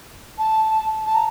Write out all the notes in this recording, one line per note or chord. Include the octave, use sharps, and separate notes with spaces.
A5
A5
A#5